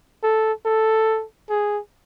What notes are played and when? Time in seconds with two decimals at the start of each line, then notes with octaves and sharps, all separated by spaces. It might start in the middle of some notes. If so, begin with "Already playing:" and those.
0.23 A4
0.65 A4
1.49 G#4